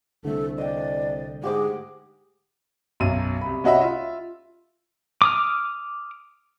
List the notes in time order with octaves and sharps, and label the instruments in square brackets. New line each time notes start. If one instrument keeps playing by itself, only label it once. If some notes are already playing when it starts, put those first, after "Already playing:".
[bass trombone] C2 [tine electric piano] D3 A3 [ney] A4
[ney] D5 [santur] D#5 G5
[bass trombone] G#2 [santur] G4 F#5 D6 [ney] G#4
[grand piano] B1 F#2 D#7
C2 B5
C#4 F#4 D#5 E5 B5
F4 E5
[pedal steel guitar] D6 D#6 F6